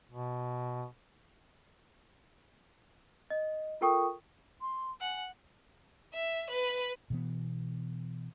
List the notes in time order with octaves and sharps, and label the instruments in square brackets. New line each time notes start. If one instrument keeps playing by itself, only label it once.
[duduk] B2
[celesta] D#5
F4 A4 A#4 G5 C#6 D#6
[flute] C6
[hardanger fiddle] F#5 [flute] G#5
[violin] E5
B4
[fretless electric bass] B2 E3 B3